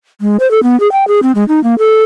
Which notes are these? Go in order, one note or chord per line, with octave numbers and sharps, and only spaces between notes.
G#3
C5
A4
B3
G#4
G5
G#4
C4
G#3
D#4
A#3
A4